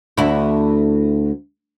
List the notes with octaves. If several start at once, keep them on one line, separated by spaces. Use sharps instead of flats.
D2 E4